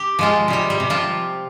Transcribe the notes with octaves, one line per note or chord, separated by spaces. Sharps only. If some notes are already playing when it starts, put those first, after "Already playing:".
Already playing: G4
F3 G#3 F4
C3 G3 G4
G3 G4
C3
F3 F4